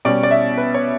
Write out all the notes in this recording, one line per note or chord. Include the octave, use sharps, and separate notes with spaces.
B2 G3 C#4 D5
D5
E5
B4
C#5